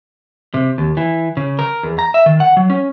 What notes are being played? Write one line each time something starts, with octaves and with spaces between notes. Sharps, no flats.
C3
D#2
E3
C#3
A#4
E2
A#5
E5
D#3
F#5
F#3
C#4